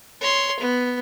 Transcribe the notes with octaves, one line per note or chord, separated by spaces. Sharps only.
C#5 C6
B3